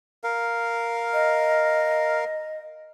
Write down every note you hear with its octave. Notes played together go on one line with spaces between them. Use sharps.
A#4 F5
D#5